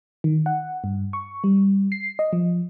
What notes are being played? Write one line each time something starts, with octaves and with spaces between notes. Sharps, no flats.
D#3
F#5
G2
C#6
G3
C7
D#5
F3